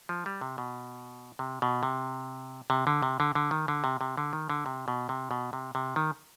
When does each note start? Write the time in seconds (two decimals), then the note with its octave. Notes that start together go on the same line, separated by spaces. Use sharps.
0.09 F3
0.26 G3
0.41 C3
0.58 B2
1.39 C3
1.62 B2
1.83 C3
2.70 C3
2.87 D3
3.02 C3
3.20 D3
3.35 D3
3.51 D#3
3.68 D3
3.84 C3
4.01 C3
4.18 D3
4.33 D#3
4.50 D3
4.66 C3
4.88 B2
5.09 C3
5.31 B2
5.53 C3
5.75 C3
5.96 D#3